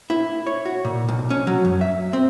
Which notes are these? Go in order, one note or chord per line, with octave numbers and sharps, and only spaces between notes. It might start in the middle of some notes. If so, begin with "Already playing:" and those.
E4
C#5
F#4
A#2
B1
C#4
F#3
F#2
E5
C4